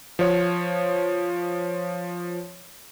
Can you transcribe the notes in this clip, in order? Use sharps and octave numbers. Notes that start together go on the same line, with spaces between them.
F3 C#5